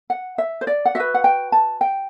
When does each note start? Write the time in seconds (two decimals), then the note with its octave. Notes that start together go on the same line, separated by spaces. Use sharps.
0.10 F#5
0.38 E5
0.61 C5
0.67 D5
0.85 F#5
0.95 F#4 B4 E5
1.14 F#5
1.24 G5
1.52 A5
1.81 G5